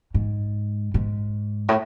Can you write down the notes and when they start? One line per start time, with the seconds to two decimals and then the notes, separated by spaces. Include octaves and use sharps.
0.14 G#2
0.94 G#2
1.69 A2